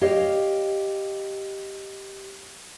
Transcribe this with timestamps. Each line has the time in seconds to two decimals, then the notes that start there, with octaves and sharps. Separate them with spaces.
0.01 G4 C#5 D#5 F5